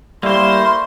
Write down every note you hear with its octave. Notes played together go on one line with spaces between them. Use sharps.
G3 A3 A#3 E4 C5 C6